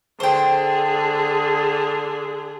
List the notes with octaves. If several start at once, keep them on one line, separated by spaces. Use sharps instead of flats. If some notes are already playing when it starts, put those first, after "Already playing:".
D3 G#4 C5 G5